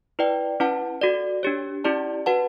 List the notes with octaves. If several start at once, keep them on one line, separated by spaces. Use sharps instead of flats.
E4 B4 D5 G5
C#4 E4 B4 F#5 A5
F#4 A4 D5
D4 G4 C#5
C#4 E4 G4 D5 A5
F#4 B4 F#5 A5